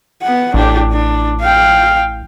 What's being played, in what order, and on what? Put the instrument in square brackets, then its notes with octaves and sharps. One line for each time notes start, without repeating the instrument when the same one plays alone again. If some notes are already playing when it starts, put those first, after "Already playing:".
[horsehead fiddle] B3 F#5
[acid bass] A1 [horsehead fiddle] D4 G4
[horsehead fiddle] D4
F5 G5